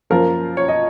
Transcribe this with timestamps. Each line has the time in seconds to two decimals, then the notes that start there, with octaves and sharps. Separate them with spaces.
0.10 F#2 F3 A#3 F4 A#4
0.57 C#5
0.68 D#5